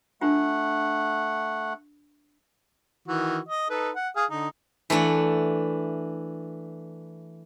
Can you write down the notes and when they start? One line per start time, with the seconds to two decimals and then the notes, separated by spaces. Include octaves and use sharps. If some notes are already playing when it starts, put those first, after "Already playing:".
0.21 A3 D4 F4 F#5
3.08 D#3 E3 F#4
3.49 D#5
3.70 D#4 A4 B4
3.95 F#5
4.16 G#4 F5 D#6
4.30 D3 D#4
4.90 E3 A3 D4 F#5